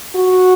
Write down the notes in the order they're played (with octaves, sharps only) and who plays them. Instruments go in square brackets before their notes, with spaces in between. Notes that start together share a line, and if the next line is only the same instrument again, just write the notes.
[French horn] F#4